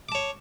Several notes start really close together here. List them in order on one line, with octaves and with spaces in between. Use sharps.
D6 A5 C#5